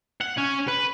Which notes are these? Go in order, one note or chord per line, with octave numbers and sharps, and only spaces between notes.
F#5
C#4
B4